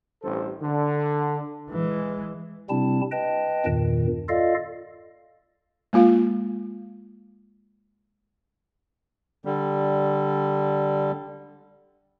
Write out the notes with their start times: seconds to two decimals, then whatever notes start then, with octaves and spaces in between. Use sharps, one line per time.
0.23 A1 G2 A4 C5
0.62 D3
1.71 E3 G#3
2.70 C3 G3 C4 D4 E4 A5
3.12 B4 D#5 G5 A5
3.66 E2 G2 A#2 D#3
4.29 F4 A4 D5 D#5 F5
5.93 G#3 A#3 F4 F5
9.45 D3 G3